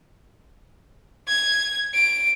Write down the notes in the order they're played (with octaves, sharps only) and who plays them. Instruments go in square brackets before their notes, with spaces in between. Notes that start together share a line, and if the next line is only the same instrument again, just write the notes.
[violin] G#6
D7